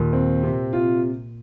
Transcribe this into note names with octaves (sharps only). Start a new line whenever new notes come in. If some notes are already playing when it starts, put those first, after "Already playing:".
Already playing: D#2 A#2
C4
C3
F4